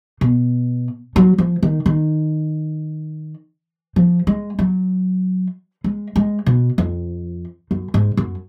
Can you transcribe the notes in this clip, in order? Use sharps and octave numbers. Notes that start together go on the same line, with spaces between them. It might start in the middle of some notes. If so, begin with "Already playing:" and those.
B2
F#3
F3
D#3
D#3
F3
G#3
F#3
G#3
G#3
B2
F2
F#2
G#2
F#2